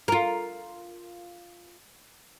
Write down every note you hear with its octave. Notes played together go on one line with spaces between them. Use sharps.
F4 A#4